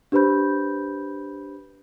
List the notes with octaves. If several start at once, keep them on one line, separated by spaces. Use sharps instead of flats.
D4 G4 B4 C5 B5 G6